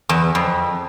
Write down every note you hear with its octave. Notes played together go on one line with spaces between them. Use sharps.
E2
F2